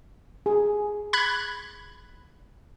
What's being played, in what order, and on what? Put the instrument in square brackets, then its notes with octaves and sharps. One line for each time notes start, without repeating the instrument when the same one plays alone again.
[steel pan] G#4
[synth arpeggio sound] B5 F#6 G#6